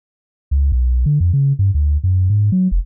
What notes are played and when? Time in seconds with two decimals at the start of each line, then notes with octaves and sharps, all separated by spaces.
0.51 C#2
0.72 B1
1.06 D3
1.20 F2
1.33 C#3
1.59 G2
1.74 D2
2.04 F#2
2.29 G#2
2.52 F#3
2.71 F1